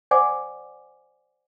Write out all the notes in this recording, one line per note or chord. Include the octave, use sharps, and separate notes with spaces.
C5 D5 F#5 G#5 D6